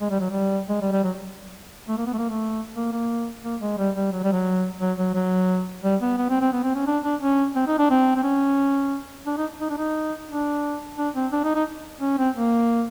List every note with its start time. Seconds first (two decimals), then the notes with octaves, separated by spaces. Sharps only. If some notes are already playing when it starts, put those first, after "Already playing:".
0.01 G#3
0.11 G3
0.20 F#3
0.30 G3
0.69 G#3
0.82 G3
0.92 G3
1.03 F#3
1.89 A3
1.97 A#3
2.07 B3
2.13 A3
2.18 A#3
2.29 A3
2.76 A#3
2.93 A#3
3.44 A#3
3.61 G#3
3.78 G3
3.96 G3
4.13 F#3
4.23 G3
4.32 F#3
4.81 F#3
4.98 F#3
5.15 F#3
5.84 G3
6.01 B3
6.18 B3
6.30 C4
6.41 C4
6.52 B3
6.64 C4
6.75 C#4
6.87 D4
7.04 D4
7.21 C#4
7.55 C4
7.67 D#4
7.79 D4
7.90 C4
8.16 C4
8.24 C#4
9.26 D4
9.37 D#4
9.61 D#4
9.70 D4
9.78 D#4
10.30 D4
10.98 D4
11.15 C4
11.32 D4
11.44 D#4
11.55 D#4
12.01 C#4
12.18 C4
12.35 A#3